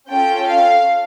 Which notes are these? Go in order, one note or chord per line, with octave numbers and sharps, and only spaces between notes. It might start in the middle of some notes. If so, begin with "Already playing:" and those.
C#4 F4 A4 G5
F5